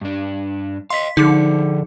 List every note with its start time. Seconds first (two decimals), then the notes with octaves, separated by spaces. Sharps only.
0.01 G2 D4
0.90 D#5 F5 C6 B6
1.17 D3 F3 D#4 G#4 D6